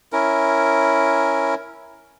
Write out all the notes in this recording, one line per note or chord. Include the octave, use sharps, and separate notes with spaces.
C#4 E4 A#4